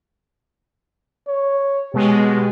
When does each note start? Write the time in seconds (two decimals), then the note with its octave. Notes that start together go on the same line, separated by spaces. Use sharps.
1.28 C#5
1.94 B2 G#3 G4